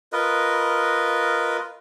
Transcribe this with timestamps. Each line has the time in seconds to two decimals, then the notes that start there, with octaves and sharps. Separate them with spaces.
0.13 F4 A#4 B4 D#5